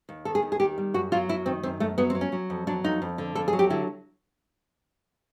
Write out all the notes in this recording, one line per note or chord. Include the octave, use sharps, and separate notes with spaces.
D#2
D#3 A4
G#4
D#2
G#4
D#3 G4
G3
F#2 F#4
F#3 F4
F#2 E4
D#3 C4
F#2 C4
F#2 A3
F#3 B3
C4
F#3
C#4
F#3
F2
F#3 D4
F2 D#4
F2
D3
F2 A4
G#4
F#3
G4
D3 E4